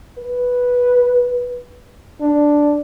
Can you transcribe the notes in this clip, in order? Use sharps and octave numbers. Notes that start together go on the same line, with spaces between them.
B4
D4